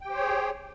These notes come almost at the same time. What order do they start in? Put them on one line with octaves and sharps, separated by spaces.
G5 G4 C5 C#5 G#4